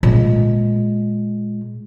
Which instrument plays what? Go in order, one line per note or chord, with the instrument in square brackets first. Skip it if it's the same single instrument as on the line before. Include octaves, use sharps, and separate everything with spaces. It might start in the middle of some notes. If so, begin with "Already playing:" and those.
[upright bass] A#2 G#3